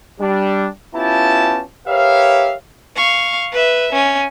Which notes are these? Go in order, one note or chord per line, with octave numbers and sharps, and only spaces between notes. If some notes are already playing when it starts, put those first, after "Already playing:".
G3 D4
B3 C#4 E4 F4 G4 A5
G4 A#4 B4 C#5 E5 F5
F5 C#6
B4 E5
C#4